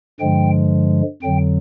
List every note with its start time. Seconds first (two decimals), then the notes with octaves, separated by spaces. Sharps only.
0.20 G2 D3 F3 G#3 G5
1.22 F2 D3 F#3 G5